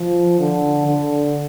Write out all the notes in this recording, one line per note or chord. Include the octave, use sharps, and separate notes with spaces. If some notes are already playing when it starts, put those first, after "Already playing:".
Already playing: F3
D3
D3